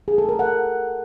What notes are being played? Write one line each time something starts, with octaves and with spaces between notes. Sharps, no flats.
G#4
A4
A#4
F#5